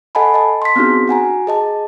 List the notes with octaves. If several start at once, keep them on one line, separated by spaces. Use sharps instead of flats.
A4 D#5 F#5 G#5 A5 B5
D#5 A5
C6 B6
B3 C4 D4 D#4 F#4 G#4
F#4 F#5 G#5 A#5
G#4 D#5 A5